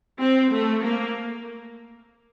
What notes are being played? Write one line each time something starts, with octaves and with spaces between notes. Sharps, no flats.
C4
A3
A#3